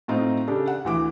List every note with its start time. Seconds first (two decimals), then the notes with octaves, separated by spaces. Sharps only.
0.08 A2 C4 D#4 F4
0.48 C#3 D4 G4 A4
0.67 F#5
0.85 D2 E3 D6